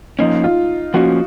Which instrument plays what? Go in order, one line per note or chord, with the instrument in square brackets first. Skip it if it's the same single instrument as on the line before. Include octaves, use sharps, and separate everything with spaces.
[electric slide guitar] F3 A#3 C#4 [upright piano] D#4
[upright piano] F4
[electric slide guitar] F3 A#3 C#4 [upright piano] F#4